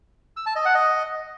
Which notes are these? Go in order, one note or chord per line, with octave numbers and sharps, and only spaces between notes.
E6
A5
D#5
F#5
D#5